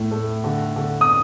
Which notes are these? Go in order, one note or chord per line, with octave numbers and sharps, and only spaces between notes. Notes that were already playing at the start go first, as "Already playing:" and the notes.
Already playing: A2 A3
A3
D3
D3
D#6